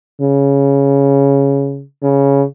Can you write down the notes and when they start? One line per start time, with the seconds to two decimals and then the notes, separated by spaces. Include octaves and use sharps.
0.21 C#3
2.03 C#3